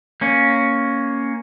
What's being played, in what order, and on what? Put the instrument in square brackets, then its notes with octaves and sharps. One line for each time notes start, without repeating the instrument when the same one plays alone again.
[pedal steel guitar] A#3 C#4